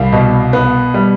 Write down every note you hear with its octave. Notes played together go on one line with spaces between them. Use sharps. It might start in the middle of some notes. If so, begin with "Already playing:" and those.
Already playing: C2 G3 F5
B2
B3
G3